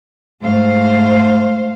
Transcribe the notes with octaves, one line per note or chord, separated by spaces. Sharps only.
G#2 A3 C5 F5